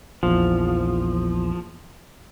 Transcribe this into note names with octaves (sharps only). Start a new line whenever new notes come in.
A#1 E2 F3